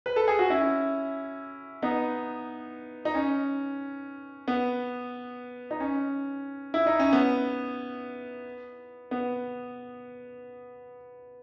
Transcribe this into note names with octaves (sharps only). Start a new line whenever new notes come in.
B4
A4
G#4
F#4
C#4 E4
B3 D#4
D#4
C#4
B3
D#4
C#4
E4
D#4
C#4
B3
B3